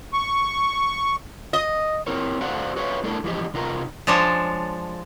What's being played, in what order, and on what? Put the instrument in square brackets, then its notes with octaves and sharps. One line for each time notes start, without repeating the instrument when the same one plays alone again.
[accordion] C#6
[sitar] D#5
[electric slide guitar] C4 E4 A#4 C#5
F#4 A4 C5 D5 F5 F#5
F#4 B4 C#5 E5 F5
A3 D4 E4 A4 A#4
E3 F3 G#3 G4 D#5
C3 D#4 F4 A#4
[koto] F3 G#3 D4 C#5 A5